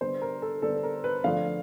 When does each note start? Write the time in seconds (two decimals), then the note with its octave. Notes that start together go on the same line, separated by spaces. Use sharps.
0.01 D3 G3 B3 C5
0.21 A#4
0.42 A4
0.62 D3 G3 B3 A4
0.83 A#4
1.04 B4
1.24 D3 F3 A3 F5